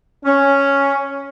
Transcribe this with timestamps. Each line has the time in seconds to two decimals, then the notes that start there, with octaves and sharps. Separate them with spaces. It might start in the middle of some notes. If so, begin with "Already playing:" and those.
0.25 C#4